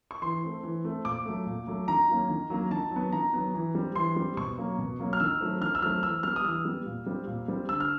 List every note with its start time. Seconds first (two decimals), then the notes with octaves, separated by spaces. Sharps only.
0.11 C#6
0.22 E3 C6
0.43 A3 C4
0.63 E3
0.84 A3 C4
1.05 A#2 D6
1.26 F#3 A3
1.46 A#2
1.67 F#3 A3
1.88 D#3 A#5
2.09 F#3 A#3 C#4
2.30 D#3
2.50 F#3 A#3 C#4
2.71 D#3 A5
2.91 F#3 B3
3.12 D#3 A#5
3.33 F#3 B3
3.54 E3
3.75 G3 C4
3.96 E3 C6
4.16 G3 C4
4.37 B2 C#6
4.58 F#3 A#3 C#4
4.78 B2
4.99 F#3 A#3 C#4
5.13 F6
5.20 D#3 E6
5.41 F#3 A3 C4
5.61 D#3 F6
5.75 E6
5.82 F#3 A3 C4 F6
6.03 E3 E6
6.23 G3 B3 F6
6.36 D#6
6.44 E3 E6
6.65 G3 B3
6.86 A#2
7.06 G3 C4
7.27 A#2
7.48 G3 C4
7.69 D3 E6
7.80 F6